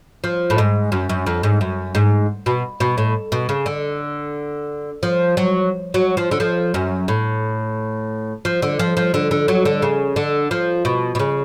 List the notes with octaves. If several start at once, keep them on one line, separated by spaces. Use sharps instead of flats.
F3
A2
G#2
F#2
F#2
F2
G#2
F#2
G#2
B2
B2
A2
B2
C#3
D3
F3
F#3
F#3
F3
D3
F3
F#2
A2
F3
D3
F3
F3
D3
D3
F#3
D3
C#3
D3
F3
B2
B2
C#3